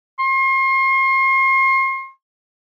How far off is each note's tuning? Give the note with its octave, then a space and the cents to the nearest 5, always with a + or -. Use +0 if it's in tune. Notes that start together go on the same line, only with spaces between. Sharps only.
C6 +40